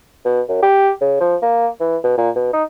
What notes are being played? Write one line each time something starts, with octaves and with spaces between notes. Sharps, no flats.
B2
F#2
G4
C#3
F3
A#3
E3
B2
A#2
B2
D#4